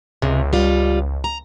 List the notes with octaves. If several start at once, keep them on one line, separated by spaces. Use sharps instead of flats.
C#2 C3
G3 F4
A#5